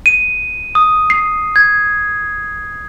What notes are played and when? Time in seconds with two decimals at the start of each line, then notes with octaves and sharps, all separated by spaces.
0.06 D#7
0.75 D#6
1.10 C7
1.56 G#6